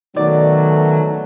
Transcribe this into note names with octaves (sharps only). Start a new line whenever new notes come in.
B2 D#3 F#3 A3 D5